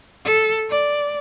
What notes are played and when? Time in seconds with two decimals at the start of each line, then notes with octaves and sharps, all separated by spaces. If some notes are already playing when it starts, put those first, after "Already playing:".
0.25 A4
0.70 D5